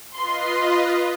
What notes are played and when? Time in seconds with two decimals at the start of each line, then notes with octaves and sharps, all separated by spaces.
0.15 F4 B4 D#5 C6